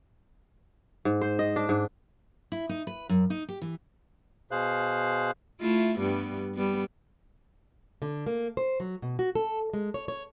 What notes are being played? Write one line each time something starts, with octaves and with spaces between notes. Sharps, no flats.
G#2
C5
D#5
D4
G#2
E4
D#4
B4
F#2
D#4
G4
E3
B2 G#4 C5 F5 F#6
A3 E4 F4
G2 G3 B3
G3 B3
D3
A#3
C5
F#3
B2
F#4
A4
G#3
C#5
C#5